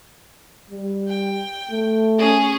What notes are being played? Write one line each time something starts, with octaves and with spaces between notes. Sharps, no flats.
G3
G5
A3
C#4 G#4